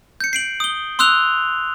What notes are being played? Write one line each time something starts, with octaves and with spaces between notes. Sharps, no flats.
G6 C#7
C7 D7 F#7
D#6 G7
C6 D#6 E6 F#6 F7 G7